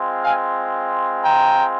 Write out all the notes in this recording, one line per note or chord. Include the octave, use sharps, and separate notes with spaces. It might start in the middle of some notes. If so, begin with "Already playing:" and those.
Already playing: G#3 C4 F4
F5 G#5
G5 A#5